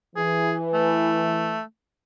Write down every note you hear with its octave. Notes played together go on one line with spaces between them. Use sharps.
E3 G#4
A3